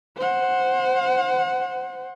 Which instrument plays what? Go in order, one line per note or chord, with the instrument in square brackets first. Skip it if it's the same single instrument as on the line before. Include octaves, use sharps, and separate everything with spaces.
[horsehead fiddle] C5 F#5